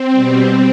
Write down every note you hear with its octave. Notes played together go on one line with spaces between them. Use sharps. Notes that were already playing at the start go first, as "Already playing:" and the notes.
Already playing: C4
B2 G3